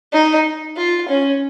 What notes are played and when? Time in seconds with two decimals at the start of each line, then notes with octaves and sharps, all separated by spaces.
0.13 D#4
0.77 F4
1.09 C#4